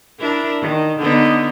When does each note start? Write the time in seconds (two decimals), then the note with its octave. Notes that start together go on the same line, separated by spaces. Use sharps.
0.20 D4 E4 A#4
0.61 D#3
1.00 D3 B3 D#4